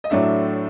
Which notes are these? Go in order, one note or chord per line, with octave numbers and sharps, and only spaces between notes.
D#5
A2 F#3 A3 D4 E5